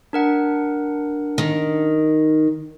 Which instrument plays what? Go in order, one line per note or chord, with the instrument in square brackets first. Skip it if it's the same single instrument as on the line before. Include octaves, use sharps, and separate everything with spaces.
[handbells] D4 A#4 F#5
[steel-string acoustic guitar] D#3